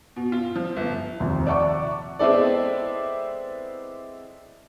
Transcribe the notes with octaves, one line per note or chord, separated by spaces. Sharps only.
B2
F4
F3
G1
F1 A#1 D#2 C3
D5 E5 F#5 A5 C#6 D6
G#3 B3 C4 E4 A4 D5